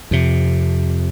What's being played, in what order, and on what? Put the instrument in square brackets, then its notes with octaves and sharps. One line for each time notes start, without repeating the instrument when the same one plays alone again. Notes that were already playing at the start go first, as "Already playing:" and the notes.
[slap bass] F2 C3